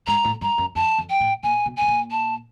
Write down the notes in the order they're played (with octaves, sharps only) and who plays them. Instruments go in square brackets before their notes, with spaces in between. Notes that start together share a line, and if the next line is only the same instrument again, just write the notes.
[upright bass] G#2 [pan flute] A#5
[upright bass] A2
[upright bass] G2 [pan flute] A#5
[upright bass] F#2
[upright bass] F2 [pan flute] A5
[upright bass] F2
[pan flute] G5
[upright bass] A2
[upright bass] A#2 [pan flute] G#5
[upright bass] B2
[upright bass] B2 [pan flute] G#5
[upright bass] A#2
[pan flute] A5